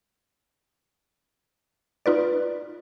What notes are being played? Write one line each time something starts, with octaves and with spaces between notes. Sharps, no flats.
D#4 F4 B4 D5